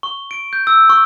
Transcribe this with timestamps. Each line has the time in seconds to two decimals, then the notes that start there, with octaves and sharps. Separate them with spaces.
0.03 C#6
0.31 D7
0.53 G6
0.67 E6
0.89 C#6